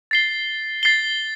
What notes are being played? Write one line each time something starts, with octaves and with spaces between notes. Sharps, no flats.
A6 C7 G7
A6 C7 G7